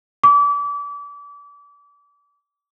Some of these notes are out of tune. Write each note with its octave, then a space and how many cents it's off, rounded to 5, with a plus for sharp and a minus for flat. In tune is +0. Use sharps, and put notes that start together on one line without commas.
D6 -35